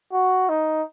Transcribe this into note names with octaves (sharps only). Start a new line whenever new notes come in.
F#4
D#4